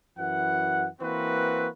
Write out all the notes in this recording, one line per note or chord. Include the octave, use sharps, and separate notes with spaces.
F#2 E3 F#5
E3 A#3 C4 F#4 B4